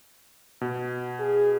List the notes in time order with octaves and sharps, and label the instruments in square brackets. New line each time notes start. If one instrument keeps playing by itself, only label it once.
[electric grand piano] B2
[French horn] G#4